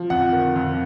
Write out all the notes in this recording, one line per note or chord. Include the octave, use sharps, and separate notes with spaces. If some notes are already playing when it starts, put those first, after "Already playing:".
Already playing: F3
F2 F#5
D#3
F2